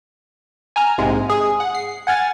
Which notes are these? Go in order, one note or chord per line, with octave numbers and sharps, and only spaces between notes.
G#5 A#5 F6
A#1 G#2 C3 G#3
G#4
F#5
C7
F#5 G#5 F6 A6